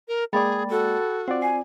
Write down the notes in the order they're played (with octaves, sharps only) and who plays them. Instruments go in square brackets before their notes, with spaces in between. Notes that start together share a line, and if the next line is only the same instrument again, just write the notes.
[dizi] A#4
[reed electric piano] G#3 A#3 D5 [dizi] G#4 [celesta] G5 B5 A6
[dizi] F#4 [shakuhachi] A4
[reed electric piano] C4 F4 D5 [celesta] F#5
[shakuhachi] G#5 [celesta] C7